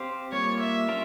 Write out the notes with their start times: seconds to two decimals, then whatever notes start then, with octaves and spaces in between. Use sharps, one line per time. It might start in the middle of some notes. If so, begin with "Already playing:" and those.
Already playing: C4 G4 C5 F5
0.32 G3 A#3 F4 C#5
0.60 E5
0.89 C#4 F4 A#4 F5